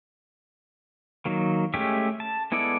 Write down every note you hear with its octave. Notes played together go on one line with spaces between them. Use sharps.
D#3 F#3 A#3
G#3 A3 C#4 G4 E5
A5
G#3 B3 E4 A4 D5